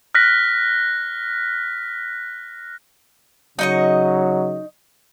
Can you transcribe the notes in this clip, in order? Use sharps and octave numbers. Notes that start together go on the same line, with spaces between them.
F6 F#6 A#6 B6
C#3 F#3 D#4 D#5 C#6